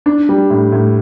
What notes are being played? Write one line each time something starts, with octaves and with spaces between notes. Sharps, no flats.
D4
G3
A2
A2